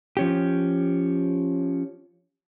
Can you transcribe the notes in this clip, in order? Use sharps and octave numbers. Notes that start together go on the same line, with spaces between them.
F3 C#4 G4